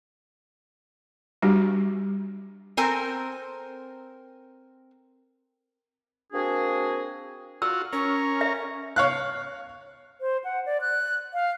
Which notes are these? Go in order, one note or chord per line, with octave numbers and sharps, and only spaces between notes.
G3 D4 F#4 G4
C4 A4 A#4 C5 G#5
A#3 C4 D4 F#4 G#4
F4 F#4 E6
C#4 A#4 C#5
E5
C#5 F5 F#6
C5
F#5
D5
F#6
F5